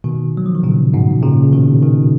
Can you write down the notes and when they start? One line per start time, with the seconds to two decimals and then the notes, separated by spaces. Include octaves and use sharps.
0.04 B2 D#3
0.37 F#3
0.46 F3
0.55 D#3
0.64 A#2 C#3
0.93 G#2 B2
1.23 A#2 C#3
1.44 C#3
1.53 B2 D#3
1.82 B2 D#3